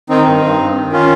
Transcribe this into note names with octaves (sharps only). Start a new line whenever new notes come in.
D#3 C4 D#4
G2
G2
G2
D#3
C#4 F4